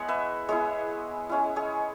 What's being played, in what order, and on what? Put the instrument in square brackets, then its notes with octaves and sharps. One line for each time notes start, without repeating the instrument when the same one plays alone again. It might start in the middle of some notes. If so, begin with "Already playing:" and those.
Already playing: [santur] G#3 B3 E4 C#5 F#5
B4 E5
G#3 B3 E4 G#4 C#5
G#3 C#4 E4
G#4 C#5